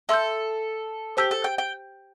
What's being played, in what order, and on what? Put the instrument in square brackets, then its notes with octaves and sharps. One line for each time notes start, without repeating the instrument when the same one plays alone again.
[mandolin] A4 [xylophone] E5 C6 E6 G6
[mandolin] G4 [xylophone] C5 A5 E6 G6
[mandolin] A4
G5
G5